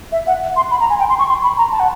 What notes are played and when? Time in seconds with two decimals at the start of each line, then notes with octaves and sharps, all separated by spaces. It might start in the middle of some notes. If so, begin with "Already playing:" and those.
0.12 E5
0.27 F#5
0.56 C6
0.71 B5
0.80 A#5
0.90 G#5
0.99 G5
1.09 C6
1.19 C#6
1.29 C6
1.43 B5
1.58 A#5
1.72 A5
1.80 F#5